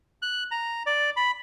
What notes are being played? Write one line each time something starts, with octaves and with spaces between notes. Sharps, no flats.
F#6
A#5
D5
B5